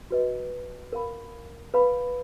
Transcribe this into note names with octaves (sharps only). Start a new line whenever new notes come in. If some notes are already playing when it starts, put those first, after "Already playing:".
F#4 B4 D#5
A#4 F5 B5
B4 F5 B5